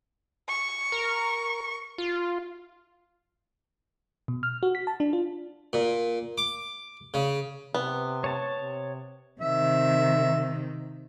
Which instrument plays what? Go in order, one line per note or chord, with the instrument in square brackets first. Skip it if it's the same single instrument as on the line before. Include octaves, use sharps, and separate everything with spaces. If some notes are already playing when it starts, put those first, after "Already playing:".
[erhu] C#6
[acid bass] A#4
F4
[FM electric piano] B2
F6
F#4
B6
A5
D4
F4
[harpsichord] A#2
D6
C#3
[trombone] C3 [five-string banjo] B3
[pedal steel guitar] C#5 A5
[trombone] C3
[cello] C3 D#3 [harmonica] E5